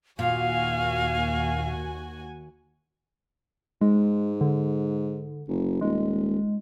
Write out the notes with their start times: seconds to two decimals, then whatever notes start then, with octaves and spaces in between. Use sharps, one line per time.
0.19 D#2 A#2 F#4 F5 G#5
3.81 G#2 G#3
4.41 D3
5.48 F#1
5.81 D#1 G#3